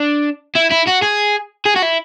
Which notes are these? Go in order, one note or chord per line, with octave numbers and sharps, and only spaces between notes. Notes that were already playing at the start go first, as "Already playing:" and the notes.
Already playing: D4
E4
E4
F#4
G#4
G#4
F#4
E4